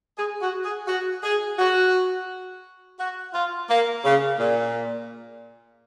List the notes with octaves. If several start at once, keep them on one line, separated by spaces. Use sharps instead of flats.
G#4
F#4
G#4
F#4
G#4
F#4
F#4
F4
A#3
C#3
A#2